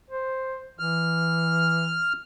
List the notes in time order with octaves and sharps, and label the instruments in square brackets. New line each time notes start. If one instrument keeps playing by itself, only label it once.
[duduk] C5
[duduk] E3 [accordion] F6